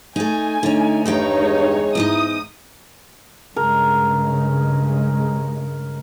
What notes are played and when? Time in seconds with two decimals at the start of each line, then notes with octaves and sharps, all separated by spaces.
0.16 A3 D#4 G#5
0.63 D3 A3 D#4 C#5
1.06 E2 G2 D#3 D#4 C#5 G5
1.41 G#3
1.95 E2 G#2 D#4 E4 D#6
3.56 G2 C#3 G#3 A#4